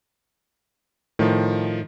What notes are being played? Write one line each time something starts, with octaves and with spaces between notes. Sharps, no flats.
A2 D#3 F3